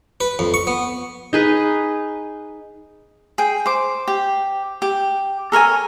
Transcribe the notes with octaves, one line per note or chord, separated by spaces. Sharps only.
B4
F2
C#6
B3
D#4 G#4 B4
G#4 G5
C5 D6
G4
G4
A4 A#4 C#5 G#5